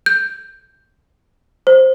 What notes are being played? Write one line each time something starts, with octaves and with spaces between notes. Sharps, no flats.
G6
C5